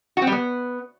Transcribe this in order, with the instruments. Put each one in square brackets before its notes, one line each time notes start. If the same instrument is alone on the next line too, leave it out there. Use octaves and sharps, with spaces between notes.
[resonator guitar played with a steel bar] F#4
C4
G3
B3